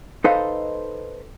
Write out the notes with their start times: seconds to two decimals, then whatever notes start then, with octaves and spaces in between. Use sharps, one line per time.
0.24 D#4 A4 B4 C5 D#5 F5